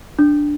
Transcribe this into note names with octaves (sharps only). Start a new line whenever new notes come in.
D4